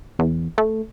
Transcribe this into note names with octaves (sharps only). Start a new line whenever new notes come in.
E2
A3